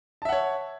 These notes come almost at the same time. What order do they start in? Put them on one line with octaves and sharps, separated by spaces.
A5 E5 F#5 C#5